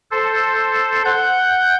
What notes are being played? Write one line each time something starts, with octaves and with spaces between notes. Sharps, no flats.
A4 C5
F#5 G6